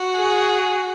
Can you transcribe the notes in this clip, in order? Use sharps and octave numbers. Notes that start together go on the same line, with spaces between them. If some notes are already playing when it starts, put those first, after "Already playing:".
Already playing: F#4
G#4